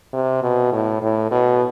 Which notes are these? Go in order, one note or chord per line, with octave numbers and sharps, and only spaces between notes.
C3
B2
A2
A2
B2